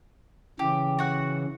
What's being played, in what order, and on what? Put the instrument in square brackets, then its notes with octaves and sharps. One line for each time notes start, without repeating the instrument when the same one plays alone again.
[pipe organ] C#3 E3 [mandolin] G4
[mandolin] F#4 F#5